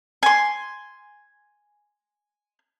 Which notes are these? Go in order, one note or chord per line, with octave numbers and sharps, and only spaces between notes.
G#5 C6